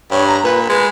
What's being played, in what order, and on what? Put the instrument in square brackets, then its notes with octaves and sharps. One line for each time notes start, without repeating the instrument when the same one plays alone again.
[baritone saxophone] G2 [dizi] C#5
[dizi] A#5
[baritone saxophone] A#2 [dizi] B4
[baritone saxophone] G#3 [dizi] B4